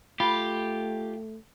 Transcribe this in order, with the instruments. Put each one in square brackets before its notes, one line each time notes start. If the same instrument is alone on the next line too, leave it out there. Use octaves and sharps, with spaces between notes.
[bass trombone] A3 [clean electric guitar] F4 [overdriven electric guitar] G4 [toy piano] B5